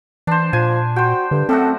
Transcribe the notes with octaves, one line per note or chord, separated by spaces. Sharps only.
E3 D4 C5
A#2 F3 G#5
F#4 C5 G5
G2 D3
F#2 A3 C4 F#4 A4